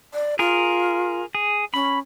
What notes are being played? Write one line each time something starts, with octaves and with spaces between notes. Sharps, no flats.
D5
F4 G#4 A#4
G#4
C#4 B5